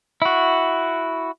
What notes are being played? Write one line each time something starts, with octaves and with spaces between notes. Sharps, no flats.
E4 F#4